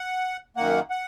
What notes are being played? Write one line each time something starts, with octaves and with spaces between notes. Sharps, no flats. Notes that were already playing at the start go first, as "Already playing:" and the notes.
Already playing: F#5
F#2 D#3 A#3 F#5
F#5